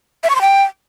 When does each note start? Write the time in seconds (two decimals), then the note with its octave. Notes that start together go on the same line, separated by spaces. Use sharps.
0.24 E5
0.30 C#6
0.36 C6
0.41 G5